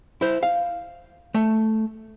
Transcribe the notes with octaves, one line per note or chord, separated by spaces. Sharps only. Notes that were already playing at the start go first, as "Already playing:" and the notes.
E4 C5
F5
A3